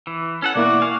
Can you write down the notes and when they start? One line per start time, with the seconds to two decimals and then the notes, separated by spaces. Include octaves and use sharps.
0.07 E3
0.42 C#4 A4 F#5
0.55 B2 A#3 E4 F#4 D5
0.82 F5 G#5 C#6 F6